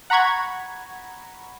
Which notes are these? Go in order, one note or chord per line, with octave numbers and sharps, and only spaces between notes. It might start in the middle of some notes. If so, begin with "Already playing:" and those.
F#5 A#5 B5 C#6 G#6